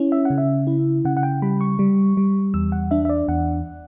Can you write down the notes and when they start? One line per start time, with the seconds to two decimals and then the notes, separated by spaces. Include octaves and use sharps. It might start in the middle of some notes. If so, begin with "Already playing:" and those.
Already playing: C#4 E4
0.12 E5
0.25 C#3 F#5
0.38 E5
0.67 E4
1.05 C#3 F#5
1.17 F#5
1.23 G5
1.42 G3 B5
1.61 C#6
1.79 G3
2.17 G3
2.54 E2 E6
2.72 F#5
2.91 D4 E5
3.05 E5
3.09 D5
3.28 E2 F#5